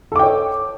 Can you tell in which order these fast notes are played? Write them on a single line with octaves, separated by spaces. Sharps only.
A4 D6 G5 C#5